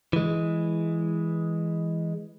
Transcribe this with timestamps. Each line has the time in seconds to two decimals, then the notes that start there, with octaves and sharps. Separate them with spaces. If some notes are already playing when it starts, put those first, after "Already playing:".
0.13 E3 G#3